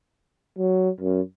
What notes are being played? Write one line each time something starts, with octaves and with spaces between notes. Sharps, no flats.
F#3
F#2